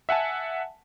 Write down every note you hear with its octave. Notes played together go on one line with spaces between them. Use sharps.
E5 F#5 G#5 A5